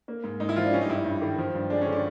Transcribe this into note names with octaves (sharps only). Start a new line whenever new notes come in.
A#3
G#2
G#2 D#4
E4
F3 F4
D4
G3 C#4
D#4
G2 E4
D#4
G2
D#3
F3
G2
G#3 D4
C#4
D3
D4